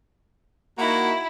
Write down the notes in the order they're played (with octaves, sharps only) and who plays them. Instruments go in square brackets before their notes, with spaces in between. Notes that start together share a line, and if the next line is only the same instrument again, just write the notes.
[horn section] A#3 D#4 F#4 [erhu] E4